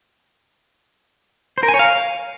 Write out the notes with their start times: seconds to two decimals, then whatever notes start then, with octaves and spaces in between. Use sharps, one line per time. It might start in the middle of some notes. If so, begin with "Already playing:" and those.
1.58 C5
1.63 A#4
1.68 G#5
1.74 C#5
1.79 F5